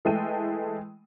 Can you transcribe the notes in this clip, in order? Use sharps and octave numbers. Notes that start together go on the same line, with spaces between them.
E3 G#3 A3 G5 D#7